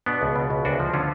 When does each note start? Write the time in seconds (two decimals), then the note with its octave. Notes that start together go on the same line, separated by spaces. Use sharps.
0.06 B2 B3 D4
0.21 C#2
0.36 B2
0.50 C#2
0.65 D2 D4 F#4
0.80 F3
0.94 D3 C#4 F4